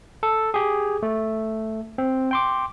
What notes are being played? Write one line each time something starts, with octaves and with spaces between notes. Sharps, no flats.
A4
G4 G#4
A3
C4
G5 C6 D6